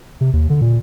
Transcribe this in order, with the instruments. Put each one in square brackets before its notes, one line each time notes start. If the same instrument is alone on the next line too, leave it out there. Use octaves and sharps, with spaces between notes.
[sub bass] C3
D#2
D3
A#2